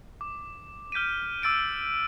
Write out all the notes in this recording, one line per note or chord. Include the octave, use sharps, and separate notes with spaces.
D6
F6 G6 B6 D7 D#7
D6 E6 A6 D7 D#7